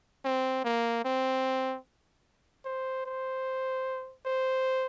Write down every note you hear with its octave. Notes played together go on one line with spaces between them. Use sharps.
C4
A#3
C4
C5
C5
C5